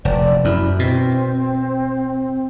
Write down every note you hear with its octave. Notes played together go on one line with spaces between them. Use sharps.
F1 D5
F#2 E4
B2 C4